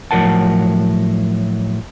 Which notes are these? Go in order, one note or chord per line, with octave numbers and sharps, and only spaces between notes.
A2 F3 F#3 A#4 F#5 A5